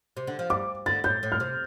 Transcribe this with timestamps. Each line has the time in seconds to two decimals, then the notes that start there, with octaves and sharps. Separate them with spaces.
0.17 C3
0.27 D3
0.39 F3
0.50 G3 D6
0.86 D3 A6
1.04 A2 G6
1.23 A2
1.32 F6
1.40 C3